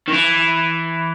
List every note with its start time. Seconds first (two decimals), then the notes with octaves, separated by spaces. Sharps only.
0.08 D#3
0.13 E3